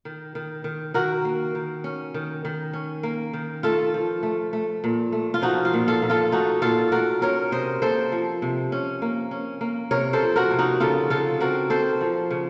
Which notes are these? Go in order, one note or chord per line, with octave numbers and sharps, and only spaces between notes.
D#3
D#3
D#3
D#3 F#4 A#4
A#3
D#3
C#4
D#3
D#3
C#4
A#3
D#3
A3 F4 A4
F3
A3
A3
A#2
A3
F4
F3 D#4 F#4
F4
A#2
F4 A4
A#2
F4 A4
A3 D#4 F#4
A#2 F4 A4
A3 F#4 A#4
C#4 A#4 C#5
C3 C5 D#5
A#3 A4 C5
F3
C3
C#4
A#3
C#4
A#3
C3 A#4 C#5
A4 C5
F3
F#4 A#4
C3
D#4 F#4
C#3 F4 A4
C#3 F4 A4
C4 F#4 A#4
C4 A4 C5
F3
C#3